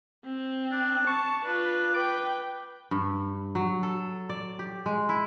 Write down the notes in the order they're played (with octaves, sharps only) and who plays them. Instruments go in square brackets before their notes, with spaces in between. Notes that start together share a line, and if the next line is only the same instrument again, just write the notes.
[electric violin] C4
[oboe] D4
[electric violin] A5 [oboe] C#6
[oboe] D4 [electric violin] F4 B4
[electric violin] B4 G5 [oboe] D6
[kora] G2
F#3
A4
D5
G4
G#3
E4